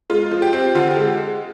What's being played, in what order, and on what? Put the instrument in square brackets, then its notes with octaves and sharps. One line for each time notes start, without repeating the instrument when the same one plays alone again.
[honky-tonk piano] G#3 F4
F3
G4
C4
D3 F4
G4
G#3